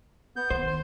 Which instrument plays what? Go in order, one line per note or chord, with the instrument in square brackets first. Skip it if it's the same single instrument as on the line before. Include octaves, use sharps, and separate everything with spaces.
[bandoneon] B3 G6
[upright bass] D#3 [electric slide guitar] C5
[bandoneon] C6